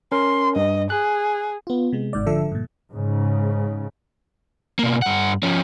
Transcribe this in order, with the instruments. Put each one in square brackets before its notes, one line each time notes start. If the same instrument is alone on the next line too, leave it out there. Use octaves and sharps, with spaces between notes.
[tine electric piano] C#4 A#4 [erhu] C6
[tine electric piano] G2 [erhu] D#5
[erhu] G#4 [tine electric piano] F#6
[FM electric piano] B3 F4
C3 G#3
G1 G#2 D5
D3 F3 A4 E5
G2 A#2
[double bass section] G#2 C#3
[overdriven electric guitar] B2 A#3
G2 F#5
F3 C#4